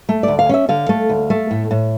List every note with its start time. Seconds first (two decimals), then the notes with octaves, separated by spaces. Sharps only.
0.09 A3
0.23 D2 D5
0.39 F5
0.49 C#4 E5
0.69 D3 F5
0.89 A3
1.09 D2
1.30 A3
1.51 A2
1.71 A2